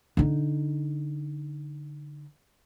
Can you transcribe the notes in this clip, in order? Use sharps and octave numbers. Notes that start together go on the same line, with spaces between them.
D3 D#4